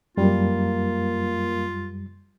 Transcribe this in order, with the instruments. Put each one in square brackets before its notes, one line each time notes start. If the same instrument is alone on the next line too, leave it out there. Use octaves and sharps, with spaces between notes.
[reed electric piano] F#2 G3 [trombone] A#3 [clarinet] F4